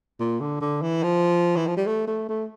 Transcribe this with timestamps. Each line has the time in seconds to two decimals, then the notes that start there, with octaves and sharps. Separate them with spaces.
0.20 A#2
0.40 D3
0.61 D3
0.82 E3
1.03 F3
1.56 E3
1.67 F3
1.77 G3
1.87 A3
2.07 A3
2.29 A3